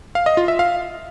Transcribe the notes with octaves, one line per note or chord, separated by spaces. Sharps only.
F5
D#5
F4
E5
F5